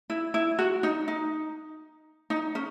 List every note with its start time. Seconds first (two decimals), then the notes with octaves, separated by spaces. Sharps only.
0.10 E4
0.34 E4
0.59 F#4
0.83 D#4
1.08 D#4
2.30 D#4
2.55 C#4